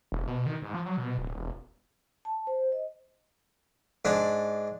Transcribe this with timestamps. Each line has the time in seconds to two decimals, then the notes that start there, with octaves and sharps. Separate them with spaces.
0.12 E1
0.27 B2
0.46 D#3
0.62 G#2
0.74 F3
0.86 F#3
0.97 B2
1.18 D1
1.37 E1
2.25 A5
2.47 C5
2.72 D#5
4.05 G#2 D4